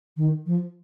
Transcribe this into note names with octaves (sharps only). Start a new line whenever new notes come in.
D#3
F3